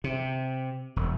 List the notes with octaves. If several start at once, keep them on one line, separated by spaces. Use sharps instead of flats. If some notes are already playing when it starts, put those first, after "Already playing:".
C3
E1